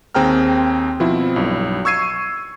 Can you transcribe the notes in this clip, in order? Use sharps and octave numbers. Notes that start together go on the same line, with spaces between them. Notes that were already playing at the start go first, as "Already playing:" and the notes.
D#2 C4 G#4 G5 A#5 F6
B2 F3 C4 E4
B1 G2
C#6 E6 G#6 C7 D#7